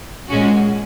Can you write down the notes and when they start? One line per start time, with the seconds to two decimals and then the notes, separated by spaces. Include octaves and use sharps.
0.28 A#2 G#3 C#4 F#4